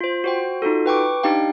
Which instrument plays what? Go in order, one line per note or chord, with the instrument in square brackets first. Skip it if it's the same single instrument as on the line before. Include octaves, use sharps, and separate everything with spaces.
[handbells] F4 C5
F#4 C5 G5
D#4 F4 F#4 A4
B4 G5 C#6 D6
D4 D#4 G4 F5 G5